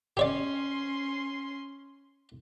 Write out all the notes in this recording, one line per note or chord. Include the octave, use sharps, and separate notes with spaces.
C#4 G4 C#5 D5 C6